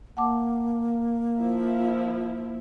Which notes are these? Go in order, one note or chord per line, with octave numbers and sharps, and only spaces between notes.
A#3 F#5 A5 D6
F3 E4